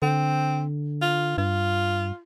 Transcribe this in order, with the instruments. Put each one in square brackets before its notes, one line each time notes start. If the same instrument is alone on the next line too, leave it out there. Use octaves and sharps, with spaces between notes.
[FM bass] D3 [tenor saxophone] C4
[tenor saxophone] F4
[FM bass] G2 [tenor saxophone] F4